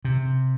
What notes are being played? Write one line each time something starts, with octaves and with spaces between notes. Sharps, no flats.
C3